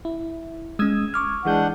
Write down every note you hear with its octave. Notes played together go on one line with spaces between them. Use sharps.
E4
G#3 C#4 D#6 E6 G#6
C#6 D6 F6
E3 G#3 D4 F#5 G6